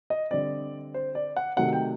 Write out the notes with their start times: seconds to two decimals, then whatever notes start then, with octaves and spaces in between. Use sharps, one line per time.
0.10 D#5
0.31 D3 G3 C4 D5
0.94 C5
1.15 D5
1.36 F#5
1.56 C3 D#3 F#3 A3 C4 F#5
1.73 G5